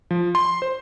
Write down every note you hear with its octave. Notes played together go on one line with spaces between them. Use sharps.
F3
C6
C5